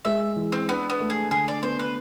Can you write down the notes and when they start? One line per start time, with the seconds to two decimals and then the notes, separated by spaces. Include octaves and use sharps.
0.05 G#3 E5
0.36 E3
0.52 C4
0.68 B3 D4
0.90 B3
1.00 A3
1.10 G#4
1.31 D3 G#4
1.48 D5
1.63 B3 C5
1.79 B4